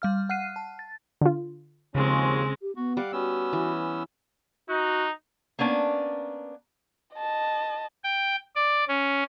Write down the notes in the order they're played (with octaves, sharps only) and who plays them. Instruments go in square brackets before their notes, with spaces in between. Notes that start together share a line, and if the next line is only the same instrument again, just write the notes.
[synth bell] G3 F5 F6
F#5 F6 F#6 C7 D#7
A5
A6
[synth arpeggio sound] D3 F4
[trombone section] D#2 F3 C#4 [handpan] C#3 [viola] G#3 C4
[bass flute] G4
[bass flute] B3 [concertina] F#4
[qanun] G3 [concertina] F5 F#5 D6
[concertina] B3 C#4 E6 [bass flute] F#4
[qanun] E3
[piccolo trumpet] D#4 [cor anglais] F#4
[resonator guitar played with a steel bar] A#3 B3 C#4 D4
[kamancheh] D#5 A5
[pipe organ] G5
D5
C#4